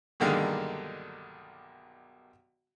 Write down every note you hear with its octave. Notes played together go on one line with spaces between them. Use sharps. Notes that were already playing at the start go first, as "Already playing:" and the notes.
B1 G2 D3 D#3 G#3 A#3